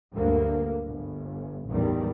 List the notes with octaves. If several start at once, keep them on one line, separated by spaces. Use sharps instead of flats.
D2 G2 D3 A#3
G1
A1 E2 D#3 G3